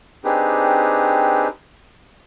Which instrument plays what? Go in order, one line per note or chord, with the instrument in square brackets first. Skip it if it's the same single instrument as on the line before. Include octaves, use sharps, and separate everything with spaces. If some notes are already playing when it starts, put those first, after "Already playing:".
[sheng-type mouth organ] C4 D4 D#4 G4 G#4 B4